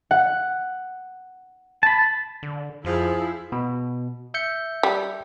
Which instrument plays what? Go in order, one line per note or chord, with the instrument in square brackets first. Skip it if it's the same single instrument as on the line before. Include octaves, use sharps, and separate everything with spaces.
[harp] F#5
[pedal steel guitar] A5 B5
[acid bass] D3
[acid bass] F2 [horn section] F3 [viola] E4 [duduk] G#4
[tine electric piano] B2
E5 G6 C#7
[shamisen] G3